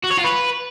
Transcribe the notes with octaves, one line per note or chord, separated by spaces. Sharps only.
F#4
C#5
F4
B4